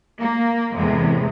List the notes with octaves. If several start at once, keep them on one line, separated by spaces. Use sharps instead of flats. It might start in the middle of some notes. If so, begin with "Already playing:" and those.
A#3
E2 A2 C3 G#3